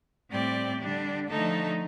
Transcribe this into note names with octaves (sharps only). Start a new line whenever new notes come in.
A2 G3 C4 G4 D5
D3 G3 D4
D3 F3 A3 D#4 A4